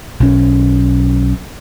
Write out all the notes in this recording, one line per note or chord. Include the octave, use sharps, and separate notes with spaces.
B1 C#4